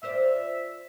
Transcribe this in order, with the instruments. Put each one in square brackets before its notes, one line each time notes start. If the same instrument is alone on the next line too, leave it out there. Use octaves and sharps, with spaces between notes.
[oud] F4 C5 D5 [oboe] E5